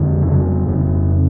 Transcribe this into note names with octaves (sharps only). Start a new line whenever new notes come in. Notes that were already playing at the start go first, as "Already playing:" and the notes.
Already playing: F2 D3
C#3
F2